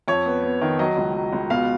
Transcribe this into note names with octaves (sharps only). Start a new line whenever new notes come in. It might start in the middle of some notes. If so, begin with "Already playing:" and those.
F2 C#5
B3
B3
D#3
F#3 D#5
C#2
F#3
C#2
B2 F5